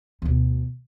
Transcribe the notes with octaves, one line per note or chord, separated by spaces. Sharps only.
D2 B2